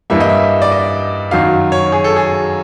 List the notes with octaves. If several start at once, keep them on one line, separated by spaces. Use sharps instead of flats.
G2 E3 G3 A#3 E5
D#5
E5
D5
D#5
F#2 D#3 F#3 F5
C#5
G#4
A4
G#4